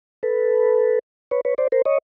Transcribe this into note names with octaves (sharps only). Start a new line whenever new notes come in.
A4 B4
B4 C#5
B4 C#5
C5 D5
A#4 C5
C#5 D#5